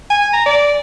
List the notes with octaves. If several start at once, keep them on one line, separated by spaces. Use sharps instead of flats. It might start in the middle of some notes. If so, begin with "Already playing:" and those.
G#5
A#5
D5